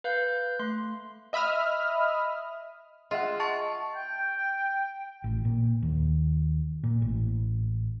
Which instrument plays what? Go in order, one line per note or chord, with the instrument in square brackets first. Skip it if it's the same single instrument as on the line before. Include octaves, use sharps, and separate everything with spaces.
[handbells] B4 F5 G6
A3 C6
[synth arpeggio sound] D#5 E5 B5 D#6 F6
[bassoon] G#3 [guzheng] F4 [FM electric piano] D#5 E5 F#5
[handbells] A5 C#6 A6
[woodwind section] G5
[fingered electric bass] A1
A#2
D#2
A#2
A1